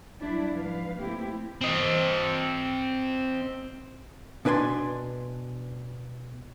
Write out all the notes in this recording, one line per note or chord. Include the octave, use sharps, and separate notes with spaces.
F#3 G3 D4 E4 D5
G#2 F3 B4 F5
A3 A#3 C4 E4 G4
C4 D#5
B2 D4 B4 G#5 C6